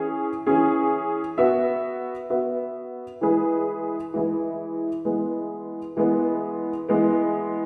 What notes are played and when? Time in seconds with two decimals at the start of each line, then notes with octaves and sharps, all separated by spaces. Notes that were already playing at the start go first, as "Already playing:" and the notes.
Already playing: E3 C#4 G#4
0.47 E3 C#4 G#4
1.38 B3 F#4 E5
2.30 B3 F#4 E5
3.21 E3 G#3 E4 G#4 B4
4.14 E3 G#3 E4 G#4 B4
5.05 E3 G#3 B3
5.97 E3 G#3 B3
6.89 E3 G#3 B3